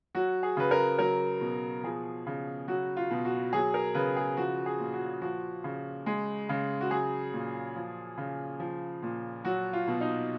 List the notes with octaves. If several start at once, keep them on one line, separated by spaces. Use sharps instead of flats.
F#3 F#4
G#4
C#3 B4
A#4
F#3 A#4
B2
F3 G#4
C#3
F#3 F#4
F4
B2
F#4
F#3 G#4
A#4
C#3 B4
G#4
F3 F#4
G#4
A#2
F#4
F3 F#4
C#3
G#3
C#3
F#4
F#3 G#4
A#2
F3
C#3
F3
A#2
F#3 F#4
F4
B2
D#4